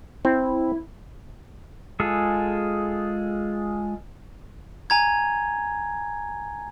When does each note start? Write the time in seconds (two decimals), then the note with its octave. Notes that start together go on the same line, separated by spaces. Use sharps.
0.25 C4 E4
2.00 G#3 F4 G#4 A4
4.90 G#5 A#5 G#6